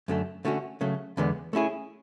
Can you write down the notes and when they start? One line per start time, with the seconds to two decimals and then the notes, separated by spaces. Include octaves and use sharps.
0.08 F#2 D3 A3
0.45 D3 A3 C#4 F#4
0.81 C#3 F#3 A3
1.17 E2 D3 G#3 B3
1.53 A3 C#4 E4 G#4